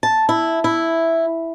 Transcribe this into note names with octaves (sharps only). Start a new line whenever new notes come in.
A5
E4
E4